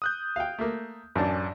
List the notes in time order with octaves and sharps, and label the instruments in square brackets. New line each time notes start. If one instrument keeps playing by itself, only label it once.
[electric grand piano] D#6 F#6 G6
[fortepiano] F5 G5
A3 A#3
[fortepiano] A1 D4 [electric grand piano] F#2 G#5 A5